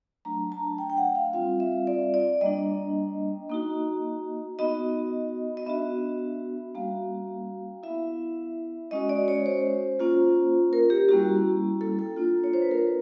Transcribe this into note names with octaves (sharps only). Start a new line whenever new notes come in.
F#3 A3 D4 A#5
A5
G5
G5
F#5
F5
G3 C4 F4 F5
E5
D5
D5
G3 A#3 D4 D#5
A#3 D#4 F#4
B3 D#4 F#4 D#5
D#5
B3 D4 F#4 E5
G3 A#3 C#4 F#4 F5
B3 E4 E5
G#3 C#4 F#4 D#5
D5
C#5
C5
A#3 C#4 F4
A#4
G4
G3 A#3 C#4 E4 F#4
A4
A4
A#3 D4 F4
C#5
C5
B4
A#4